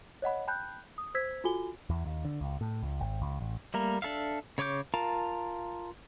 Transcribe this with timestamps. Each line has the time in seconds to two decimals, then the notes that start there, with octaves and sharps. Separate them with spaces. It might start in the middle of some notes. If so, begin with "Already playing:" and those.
0.22 C#5 D#5 F#5 B5
0.47 G5 A5 B5 F#6 G6
0.98 D#6
1.15 C5 E6 G#6 B6
1.44 F4 F#4 A4 G#5 G7
1.90 E2
2.06 D#2
2.25 D3
2.41 C#2
2.61 A2
2.83 C#2
3.01 G#1
3.22 C#2
3.40 A1
3.74 G3 A3 A#3 A#4
4.02 D4 A4 E5 F5
4.58 C#3 C#5 C#6 D6 G6
4.94 F4 A#4 F5 A5 A#5